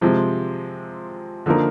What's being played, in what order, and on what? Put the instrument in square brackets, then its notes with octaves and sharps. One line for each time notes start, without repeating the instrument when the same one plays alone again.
[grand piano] C3 F3 G#3 C4
D3 F3 A#3 D#4 A#4